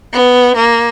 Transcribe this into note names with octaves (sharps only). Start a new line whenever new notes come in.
B3
A#3